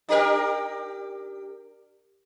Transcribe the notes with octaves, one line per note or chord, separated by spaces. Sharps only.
D4 G4 A#4